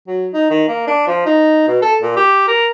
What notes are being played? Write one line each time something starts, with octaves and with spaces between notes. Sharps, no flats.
F#3
D#4
D#3
A#3
D4
F3
D#4
B2
A4
A#2
G4
A#4